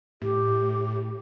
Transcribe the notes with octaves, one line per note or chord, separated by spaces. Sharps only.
A2 G4